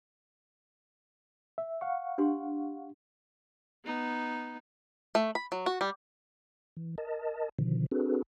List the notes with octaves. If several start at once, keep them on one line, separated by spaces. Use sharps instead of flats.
E5
F5 F#5 C#6
D4 G4 C6
B3 D#4
A3
B5
F#3
F#4
G3
E3
A#4 D#5 A5
B2 D3 D#3 F3
C4 D4 F#4 G#4 A4 B4